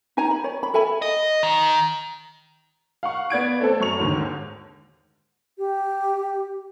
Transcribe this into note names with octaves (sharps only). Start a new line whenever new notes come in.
D#4 G#5 A#5
B5
C#5
B5
A4 E5 G#5 B5
D#5
D#3
F5 F#5 C#6
B3 D5 G#6 D7
A3 C4 A4
F#2 C#6 F7
D#2 G#2 D3
G4